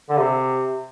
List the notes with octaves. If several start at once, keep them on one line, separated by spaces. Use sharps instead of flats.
D3
C3